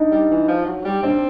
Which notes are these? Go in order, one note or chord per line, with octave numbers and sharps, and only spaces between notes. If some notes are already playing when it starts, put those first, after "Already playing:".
Already playing: D4 D#4
G3
E3
F3
F#3
G3
C4 D4